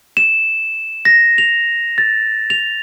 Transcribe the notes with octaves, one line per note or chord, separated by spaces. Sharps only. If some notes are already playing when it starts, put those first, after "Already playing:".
E7
A#6
F7
A6
F7